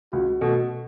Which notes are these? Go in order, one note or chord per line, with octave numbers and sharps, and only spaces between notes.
C#2 F#4
B2 A3 F#4